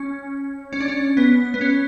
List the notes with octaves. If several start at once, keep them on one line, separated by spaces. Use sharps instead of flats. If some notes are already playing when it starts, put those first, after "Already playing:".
Already playing: C#4
C#4
D4
C#4
B3
B3
C#4